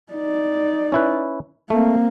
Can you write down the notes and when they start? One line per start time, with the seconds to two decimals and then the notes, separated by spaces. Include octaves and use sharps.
0.13 D#4 D5
0.92 C#4 E4 B4
1.70 A3 A#3 C4